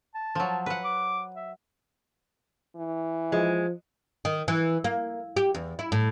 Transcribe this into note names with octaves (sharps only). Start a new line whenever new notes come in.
A5
F3 F#3
B4 F#5
D6
E5
E3
F3 G#3
D#3
E3
A#3
G4
E2
E4
A2